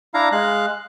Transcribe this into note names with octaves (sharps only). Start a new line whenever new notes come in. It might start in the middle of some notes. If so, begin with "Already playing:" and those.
D4 E4 F5 A#5
G#3 F5 F#6